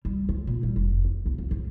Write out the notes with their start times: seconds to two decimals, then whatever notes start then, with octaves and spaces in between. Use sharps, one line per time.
0.05 G3
0.29 G#3
0.47 A#2
0.63 G3
0.76 F1
1.05 A3
1.26 B1
1.38 F2
1.51 G#2